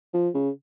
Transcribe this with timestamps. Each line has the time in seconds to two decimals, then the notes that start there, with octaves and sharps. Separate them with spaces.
0.13 F3
0.34 C#3